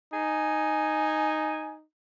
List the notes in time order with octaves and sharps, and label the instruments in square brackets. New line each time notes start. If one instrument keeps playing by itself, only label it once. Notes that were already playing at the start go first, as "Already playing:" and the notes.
[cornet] D#4 [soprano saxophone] G#5